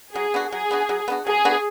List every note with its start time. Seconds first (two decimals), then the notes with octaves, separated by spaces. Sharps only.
0.15 F#3 G#4
0.34 B3 D4 F#4
0.52 F#3 G#4
0.71 B3 D4 F#4
0.89 F#3
1.08 B3 D4 F#4
1.27 F#3 G#4
1.45 B3 D4 F#4